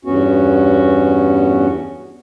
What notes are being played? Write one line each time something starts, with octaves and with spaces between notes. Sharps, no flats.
E2 G2 B3 C#4 F#4